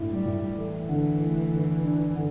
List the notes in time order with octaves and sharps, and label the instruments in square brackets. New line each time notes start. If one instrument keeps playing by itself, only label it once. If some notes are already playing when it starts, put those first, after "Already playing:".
Already playing: [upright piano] A2 D4
[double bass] G3
[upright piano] A2
[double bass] E3 [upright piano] A3
[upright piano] D3
A3
D3
D4
D3